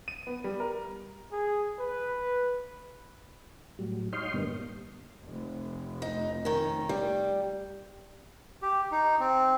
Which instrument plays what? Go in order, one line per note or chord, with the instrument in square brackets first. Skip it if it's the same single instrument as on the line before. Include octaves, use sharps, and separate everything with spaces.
[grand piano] D#7
B3
G3
A#4
[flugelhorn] G#4
B4
[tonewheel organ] A2 F#3 G3
D#4 C#5 D#5 F5 G5 C6
G2 A#2 D3 G3 A#3 B3
[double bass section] F1
[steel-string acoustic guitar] D#4
D#3 C#4
G3
[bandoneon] G4
D#4
C4